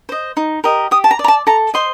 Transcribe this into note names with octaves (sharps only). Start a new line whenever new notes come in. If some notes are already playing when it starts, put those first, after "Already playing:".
C5 D#5
D#4
G4 A#4 D#5
G4 D#6
A5
A#5
D5
A#5
A5
A4 A#5
C5 D#5 C6